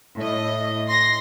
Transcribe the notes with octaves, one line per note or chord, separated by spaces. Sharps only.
A2 D#5
C6 A#6